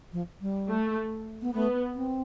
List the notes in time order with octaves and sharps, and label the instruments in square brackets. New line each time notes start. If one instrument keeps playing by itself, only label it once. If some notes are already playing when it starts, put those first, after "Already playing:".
[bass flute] F3
G3
[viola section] A3
[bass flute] B3
[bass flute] A3 [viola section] B3
[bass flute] C4